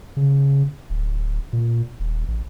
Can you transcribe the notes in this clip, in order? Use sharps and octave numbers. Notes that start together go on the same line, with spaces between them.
C#3
D1
A#2
D#1
A1